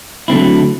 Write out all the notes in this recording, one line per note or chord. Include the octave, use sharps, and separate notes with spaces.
D3 F#3 A3 C4 E4